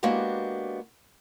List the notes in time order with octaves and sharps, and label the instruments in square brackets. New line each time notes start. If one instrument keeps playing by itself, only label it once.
[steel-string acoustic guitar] G#3 A#3 B3 D4 F#4 G4